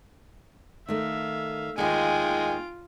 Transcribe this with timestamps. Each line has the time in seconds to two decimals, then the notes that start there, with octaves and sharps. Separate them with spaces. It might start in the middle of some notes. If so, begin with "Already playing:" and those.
0.89 D#3 A3 E5 F5
1.78 D#2 D#3 G#3 F4 G5 G#5 D7